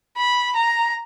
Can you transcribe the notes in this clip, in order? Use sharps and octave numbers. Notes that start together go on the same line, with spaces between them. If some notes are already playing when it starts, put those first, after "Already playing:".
B5
A#5